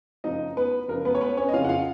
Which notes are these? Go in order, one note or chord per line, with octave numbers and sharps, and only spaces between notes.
F#1 F#2 F3 D#4 D#5
B3 B4
F#1 F#2 F3 A#4
B3 B4
C#5
B3 B4
C#4 C#5
D#5
F#1 F2 C#3 F4 F5
F#5
F4 F5